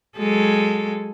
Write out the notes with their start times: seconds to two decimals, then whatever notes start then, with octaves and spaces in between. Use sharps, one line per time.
0.18 F#3 G#3 A4